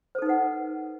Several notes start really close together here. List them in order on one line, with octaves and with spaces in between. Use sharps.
C5 A4 D#4 B4 F#5